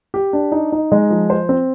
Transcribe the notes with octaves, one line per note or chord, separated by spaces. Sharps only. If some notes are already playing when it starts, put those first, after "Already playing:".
G4
D4
D#4
D#4
G#3
F3
C5
C4